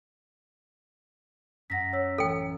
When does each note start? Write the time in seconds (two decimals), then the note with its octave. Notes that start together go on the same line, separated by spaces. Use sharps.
1.70 F#2 F#5 A#6 B6
1.93 C#5 E6 B6
2.18 A1 A4 G5